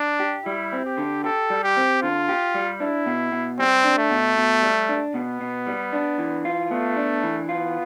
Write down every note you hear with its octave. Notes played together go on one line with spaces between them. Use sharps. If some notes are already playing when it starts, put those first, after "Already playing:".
Already playing: D4
G4
G3 E4
C4
G4
D3
G4 A4
G3
G4
C4
D3 F4
G4
G3
D4 E4
B2
B2
G3 C4
D4
A3
B2
B2
G3
D4
B2 B3
B2
G3
D4
E3
F4
A3 B3
D4
E3
B3 F4